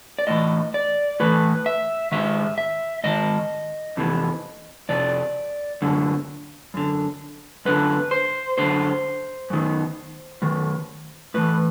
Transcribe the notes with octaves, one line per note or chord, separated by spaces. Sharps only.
D5
A2 E3 D#5
D5
A2 E3 B4
E5
G#2 D#3 E5
E5
G#2 D#3 D#5
F2 C3 E3
F2 C3 D5
F#2 D3
F#2 D3
F#2 D3 B4
C5
F#2 D3 C5
F#2 D#3
F#2 D#3
A2 E3 B4